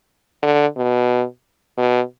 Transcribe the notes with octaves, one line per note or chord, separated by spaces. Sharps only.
D3
B2
B2